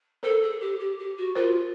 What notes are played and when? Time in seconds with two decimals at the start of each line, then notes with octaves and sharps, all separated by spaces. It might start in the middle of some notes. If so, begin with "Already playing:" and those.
0.23 A4 A#4 C5
0.42 G#4
0.60 G4
0.79 G4
0.99 G4
1.17 F#4
1.35 F4 A#4 C5